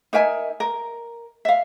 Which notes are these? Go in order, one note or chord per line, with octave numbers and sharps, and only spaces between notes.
D#4 A#4 E5 G#5
A#4
E5 F5